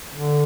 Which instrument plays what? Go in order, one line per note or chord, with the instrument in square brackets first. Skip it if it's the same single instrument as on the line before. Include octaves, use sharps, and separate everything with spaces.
[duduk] D3